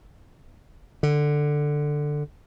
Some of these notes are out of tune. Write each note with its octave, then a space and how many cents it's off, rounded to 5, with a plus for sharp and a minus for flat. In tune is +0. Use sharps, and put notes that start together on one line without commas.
D3 +10